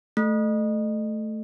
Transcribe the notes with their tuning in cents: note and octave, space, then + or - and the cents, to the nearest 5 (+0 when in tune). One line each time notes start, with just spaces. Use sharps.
A3 -10